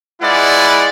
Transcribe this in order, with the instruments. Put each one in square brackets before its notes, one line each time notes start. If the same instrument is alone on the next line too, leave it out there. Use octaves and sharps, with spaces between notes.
[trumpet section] G#3 E4 F4 B4 D5 F#5